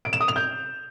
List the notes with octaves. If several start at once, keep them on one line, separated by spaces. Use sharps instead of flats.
D7
E7
D#6
F7
G6